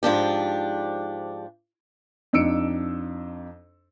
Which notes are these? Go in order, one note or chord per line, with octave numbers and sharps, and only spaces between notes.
G#2 F3 D4 G4
F2 D4 D#4 E6 C#7 D7